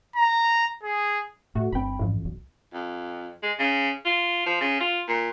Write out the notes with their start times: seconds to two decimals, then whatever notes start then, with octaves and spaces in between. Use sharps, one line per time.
0.16 A#5
0.83 G#4
1.55 A2 A3 F#4
1.72 G1 G2 C4 G5 B5
1.99 A1 F2 G#2
2.25 B1
2.74 F2
3.43 G#3
3.59 C#3
4.05 F4
4.46 F3
4.61 C#3
4.81 F4
5.08 A#2